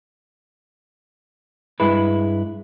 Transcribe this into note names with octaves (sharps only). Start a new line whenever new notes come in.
G2 G#3 E4 B4